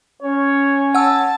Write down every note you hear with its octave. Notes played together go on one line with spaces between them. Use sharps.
C#4 C#5
F#5 A5 E6